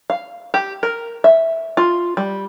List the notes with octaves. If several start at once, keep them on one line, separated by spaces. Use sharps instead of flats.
F5
G4
A#4
E5
F4
G3